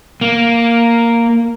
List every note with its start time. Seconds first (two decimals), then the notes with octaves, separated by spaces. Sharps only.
0.21 A#3